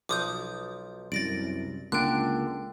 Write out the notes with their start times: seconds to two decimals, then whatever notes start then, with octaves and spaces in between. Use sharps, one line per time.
0.09 B1 F3 D6 D#6 G6
1.12 C2 F#2 D5 A6 A#6 D7
1.92 C#2 D3 A#3 D4 G5 F#6